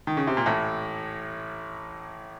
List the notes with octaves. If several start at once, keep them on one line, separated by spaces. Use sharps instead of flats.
D#3
C#3
C3
A#2
A1 A2